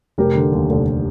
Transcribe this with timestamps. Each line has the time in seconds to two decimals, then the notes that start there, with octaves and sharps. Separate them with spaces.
0.18 F1 G4 A#4
0.35 D3
0.52 D#2
0.70 F1